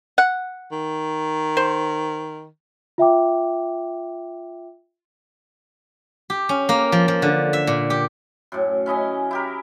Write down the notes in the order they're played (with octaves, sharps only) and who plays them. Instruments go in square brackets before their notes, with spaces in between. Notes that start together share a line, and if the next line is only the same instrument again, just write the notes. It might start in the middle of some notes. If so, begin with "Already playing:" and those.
[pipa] F#5
[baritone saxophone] D#3
[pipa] C5
[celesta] F4 E5 G5 D6
[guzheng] G4
C#4
A#3
F3
F3
D3
E5
A#2
G4
[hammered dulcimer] F#2 A2
C#4 E4 D#5 G#5
E4 G4 A#4